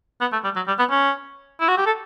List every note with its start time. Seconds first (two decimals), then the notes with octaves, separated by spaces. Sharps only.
0.21 B3
0.33 A3
0.44 G3
0.56 F#3
0.68 G3
0.79 B3
0.91 C#4
1.60 E4
1.68 F#4
1.78 G4
1.86 A4